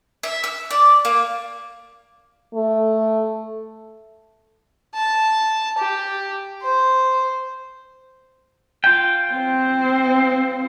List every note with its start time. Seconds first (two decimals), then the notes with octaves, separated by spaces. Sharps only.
0.23 E5
0.44 E6
0.71 D5
1.05 A#3
2.54 A3
4.94 A5
5.78 G4
6.62 C5
8.84 F4 G5
9.33 C4 C5